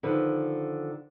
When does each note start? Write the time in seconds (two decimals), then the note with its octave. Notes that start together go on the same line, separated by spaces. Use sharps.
0.03 D3 D#3 F3 B4